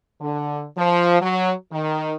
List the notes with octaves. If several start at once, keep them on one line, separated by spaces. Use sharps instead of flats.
D3
F3
F#3
D#3